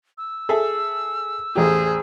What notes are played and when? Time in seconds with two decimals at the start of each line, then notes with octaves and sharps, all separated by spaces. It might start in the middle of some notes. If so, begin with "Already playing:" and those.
0.18 E6
0.49 G#4 A4 E5
1.55 A1 E2 G4 G#4 C5